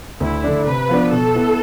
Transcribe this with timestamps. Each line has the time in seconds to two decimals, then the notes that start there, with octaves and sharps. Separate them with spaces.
0.20 D2 E4
0.44 D3 A3 D4
0.66 C3 B4
0.89 F3 B3 D4
1.11 B2 A4
1.35 B3 E4